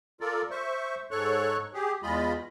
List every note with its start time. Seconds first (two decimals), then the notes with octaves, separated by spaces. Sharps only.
0.21 F4 A4 A#4 D5
0.51 C5 E5 C#6
1.11 G#2 A4 C#5 C#6 F#6
1.74 G4 G#4
2.03 E2 G#3 F4 D#5 B5